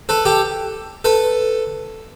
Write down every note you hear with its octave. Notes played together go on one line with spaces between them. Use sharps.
A4 B4
G4 A4
A4 B4